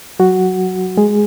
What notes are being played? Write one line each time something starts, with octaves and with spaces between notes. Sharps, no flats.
F#3 F#4
G#3 G#4